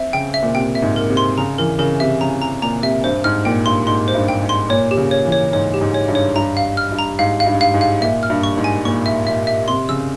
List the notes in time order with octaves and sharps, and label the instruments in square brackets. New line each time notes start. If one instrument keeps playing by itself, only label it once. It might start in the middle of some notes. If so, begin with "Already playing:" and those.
Already playing: [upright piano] C4 [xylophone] E5
[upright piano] C#3 [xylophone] G5
[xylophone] E5
[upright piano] A#2
[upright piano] C3 [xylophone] G5
[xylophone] E5
[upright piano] G#2
[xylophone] A#4
[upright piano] C3
[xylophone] C6
[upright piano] C#3 [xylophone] A#5
[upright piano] E3 [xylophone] A#4
[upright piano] C#3 [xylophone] A#4
[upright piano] C3 [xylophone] E5
[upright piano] C#3 [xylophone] A#5
[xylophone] A#5
[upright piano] A#2 [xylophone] A#5
[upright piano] C3 [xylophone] E5
[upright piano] G2 [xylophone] C5
[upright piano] G#2 [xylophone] F6
[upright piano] A#2 [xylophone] G5
[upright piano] G2 [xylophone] C6
[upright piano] G#2 [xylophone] C6
[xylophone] C5
[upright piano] G2
[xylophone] G5
[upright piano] G#2
[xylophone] C6
[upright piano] A#2 [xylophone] C#5
[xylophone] G4
[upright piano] C#3
[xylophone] C#5
[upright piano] E3
[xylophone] C#5
[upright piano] G#2 [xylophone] C#5
[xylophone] G4
[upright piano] G#2
[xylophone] C#5
[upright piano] G2
[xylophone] C#5
[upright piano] G2 [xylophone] A#5
[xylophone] F5
F6
[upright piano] G2
[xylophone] A#5
[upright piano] G#2 [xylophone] F5
[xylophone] F5
[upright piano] G2
[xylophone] F5
[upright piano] G#2
[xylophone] F5
[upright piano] A#2 [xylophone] E5
[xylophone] F6
[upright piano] G2
[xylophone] C#6
[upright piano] G#2
[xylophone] G#5
[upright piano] A#2 [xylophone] C#6
[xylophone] E5
[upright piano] A#2 [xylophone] E5
[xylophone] E5
[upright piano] C3 [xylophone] C6
[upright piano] C#3 [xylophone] E6